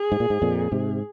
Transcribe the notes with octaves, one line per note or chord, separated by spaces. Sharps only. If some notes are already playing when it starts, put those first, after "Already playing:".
Already playing: G#4
G#2
A#2
G#2
F2 A#2
G#2 C3